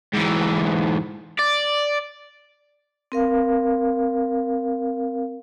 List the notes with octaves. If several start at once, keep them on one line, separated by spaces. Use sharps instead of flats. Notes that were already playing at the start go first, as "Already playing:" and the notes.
G#2 E3
D5
C4 A#4 F5